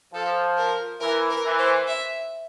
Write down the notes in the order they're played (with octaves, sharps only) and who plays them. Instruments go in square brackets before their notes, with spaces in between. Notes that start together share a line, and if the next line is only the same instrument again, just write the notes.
[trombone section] F3 [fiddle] A4
[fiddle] A#4
[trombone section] E3 [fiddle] A#4
[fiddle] A#4
[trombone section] E3
[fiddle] C5
E5